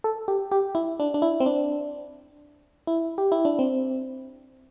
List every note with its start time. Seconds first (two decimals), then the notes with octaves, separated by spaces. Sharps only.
0.04 A4
0.28 G4
0.51 G4
0.75 E4
1.00 D4
1.14 D4
1.22 E4
1.40 C4
1.46 D4
2.87 E4
3.18 G4
3.32 E4
3.45 D4
3.59 C4